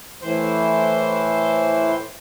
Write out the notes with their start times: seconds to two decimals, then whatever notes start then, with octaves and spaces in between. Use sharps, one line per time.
0.22 A2 E3 C5